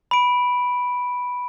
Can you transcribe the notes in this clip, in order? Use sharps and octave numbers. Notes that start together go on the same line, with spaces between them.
B5 D7